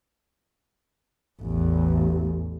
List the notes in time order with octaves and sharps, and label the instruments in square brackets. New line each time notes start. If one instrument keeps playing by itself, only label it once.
[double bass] A1 E2